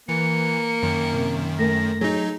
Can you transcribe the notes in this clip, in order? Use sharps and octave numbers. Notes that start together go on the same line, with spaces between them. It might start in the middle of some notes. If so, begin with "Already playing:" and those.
E3 A#3 C#7
F#2 D#3
C3
A3 A#4 A#6
F#3 D#4 G#4